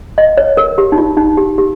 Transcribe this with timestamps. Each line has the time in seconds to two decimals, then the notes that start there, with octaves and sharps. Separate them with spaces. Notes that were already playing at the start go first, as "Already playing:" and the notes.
0.18 D#5
0.37 C#5
0.57 A#4
0.78 G4
0.92 D#4
0.98 F4
1.17 D#4
1.37 G4
1.58 G4